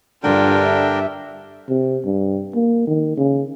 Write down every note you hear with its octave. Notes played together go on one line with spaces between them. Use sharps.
G2 D3 D4 F4 A#4 G5
E5
C3
G2
A#3
D#3
C#3